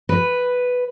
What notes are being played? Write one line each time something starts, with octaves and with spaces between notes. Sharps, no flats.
B4